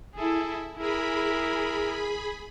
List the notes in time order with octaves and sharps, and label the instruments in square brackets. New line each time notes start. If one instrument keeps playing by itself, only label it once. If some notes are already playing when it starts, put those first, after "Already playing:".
[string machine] E4 [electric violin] G#4 A4
[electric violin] E4 A#4 [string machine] G#4 B5